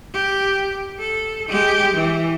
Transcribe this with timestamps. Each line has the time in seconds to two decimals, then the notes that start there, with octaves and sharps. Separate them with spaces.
0.13 G4
0.99 A4
1.48 G#3 G4
1.94 E3